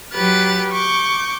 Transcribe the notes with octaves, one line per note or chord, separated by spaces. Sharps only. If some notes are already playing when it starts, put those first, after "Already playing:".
F#3 G4 B4 F#6 A6
C#6 D6 G6